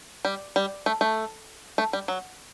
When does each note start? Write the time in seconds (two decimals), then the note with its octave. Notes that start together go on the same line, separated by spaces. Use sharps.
0.25 G3
0.56 G3
0.86 A3
1.01 A3
1.78 A3
1.93 G3
2.08 F#3